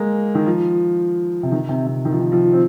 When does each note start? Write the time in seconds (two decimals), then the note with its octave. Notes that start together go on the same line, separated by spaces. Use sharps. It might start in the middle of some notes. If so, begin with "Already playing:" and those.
Already playing: G#3 A#3
0.35 D#3
0.46 F3
1.43 C3
1.52 D#3
1.69 C3
1.87 C3
2.05 D#3
2.12 F3
2.20 D#3
2.32 F3
2.52 C4